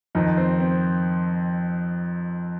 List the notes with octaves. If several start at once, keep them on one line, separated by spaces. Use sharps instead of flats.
F2 D#3 D#4
C4
C4